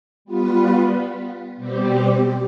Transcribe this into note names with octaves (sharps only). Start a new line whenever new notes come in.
G3 B3 F4 B4
B2 G3 C4 G4